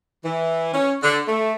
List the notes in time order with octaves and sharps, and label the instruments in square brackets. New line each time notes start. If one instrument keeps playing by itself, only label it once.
[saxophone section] E3
C#4
D3
A3